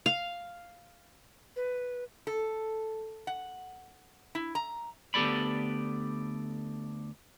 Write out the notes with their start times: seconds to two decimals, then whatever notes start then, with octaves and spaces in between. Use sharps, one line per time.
0.06 F5
1.56 B4
2.27 A4
3.27 F#5
4.35 E4
4.55 A#5
5.14 D2 B3 G4 A4 D5 B5